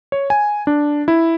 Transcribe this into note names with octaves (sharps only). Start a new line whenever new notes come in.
C#5
G#5
D4
E4